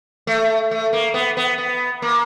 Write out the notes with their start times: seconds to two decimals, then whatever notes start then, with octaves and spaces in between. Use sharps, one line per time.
0.27 A3
0.71 A3
0.93 A#3
1.14 B3
1.37 B3
1.58 B3
2.02 A#3